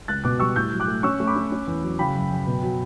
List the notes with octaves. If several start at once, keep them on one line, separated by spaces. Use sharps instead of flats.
C#2 F#6 A6
B2 D6 F#6
G3 C#6 E6
A2 E6 G6
F#3
D6 F#6
A3
C#4 C#6 E6
A3
B5 D6
C#4
C#4
E2
F#3
C#3 G5 B5
F#2
F#2
B2
F#3